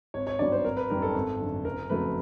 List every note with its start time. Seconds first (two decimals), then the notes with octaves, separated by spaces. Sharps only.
0.14 G#1 C#5
0.27 C#5
0.39 G2 D#3 F#3 B3 D5
0.52 C5
0.65 G#1 A#4
0.77 B4
0.90 F#2 D#3 G3 A#4
1.02 A4
1.14 G#1
1.40 F#2 D3
1.65 F#1 A#4
1.90 F2 C#3 F#3 A3 B4